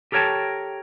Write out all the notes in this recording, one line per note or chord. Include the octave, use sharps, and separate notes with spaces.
G4 A4 A#4 C#5 G5 A5